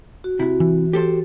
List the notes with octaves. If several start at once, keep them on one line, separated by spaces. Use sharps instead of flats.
F#4
C3 E4
E3
G4 A4 C5